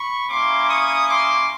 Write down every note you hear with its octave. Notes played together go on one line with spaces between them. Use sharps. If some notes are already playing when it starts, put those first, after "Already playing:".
Already playing: B5 C#6
A#3 C#4 E4 C6 D6
C#6 D#6
C6 D6